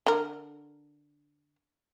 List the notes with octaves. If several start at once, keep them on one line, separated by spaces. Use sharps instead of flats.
D3 A#4